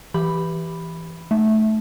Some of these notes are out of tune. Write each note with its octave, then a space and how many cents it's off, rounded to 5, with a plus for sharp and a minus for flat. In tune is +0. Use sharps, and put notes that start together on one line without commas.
E3 +0 G4 +0 B5 +0
A3 -15 D#4 -25 E5 +0